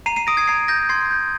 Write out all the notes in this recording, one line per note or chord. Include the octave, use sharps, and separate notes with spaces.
A#5 C7 D#7
C7 D#7
D#6 A#6 D7
G#6 C7
A#5 G#6 C7
G6 A#6
C6 G#6 C7
G6